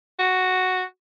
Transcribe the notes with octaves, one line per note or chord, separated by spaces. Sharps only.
F#4